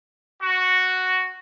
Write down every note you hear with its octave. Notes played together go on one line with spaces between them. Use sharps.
F#4